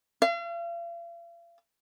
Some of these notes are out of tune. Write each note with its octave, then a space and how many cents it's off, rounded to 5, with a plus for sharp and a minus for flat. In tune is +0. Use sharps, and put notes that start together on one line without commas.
F5 -40